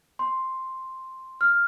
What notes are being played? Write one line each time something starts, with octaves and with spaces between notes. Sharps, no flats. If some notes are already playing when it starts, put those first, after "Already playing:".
C6
F6